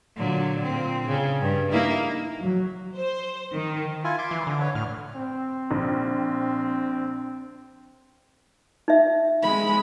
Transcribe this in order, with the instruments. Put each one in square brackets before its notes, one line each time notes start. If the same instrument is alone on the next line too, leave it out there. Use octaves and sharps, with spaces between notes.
[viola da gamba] A#2 D3 F#3
A#2 C4
C#3
G2
A#3 D#4 E4
[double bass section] F#3
[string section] C5
D#3
[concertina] E4 F4 G#5
E5 C6 D6
[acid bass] E3
D3
[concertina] B4 C#5
[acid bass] A2 [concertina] F6
[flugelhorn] C4
[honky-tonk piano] A#1
[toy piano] D#4 E5
[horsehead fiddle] G#3 B5